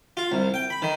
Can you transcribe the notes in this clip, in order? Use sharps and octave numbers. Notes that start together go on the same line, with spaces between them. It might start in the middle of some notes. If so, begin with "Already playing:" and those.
F4
C2
G5
B5
D#3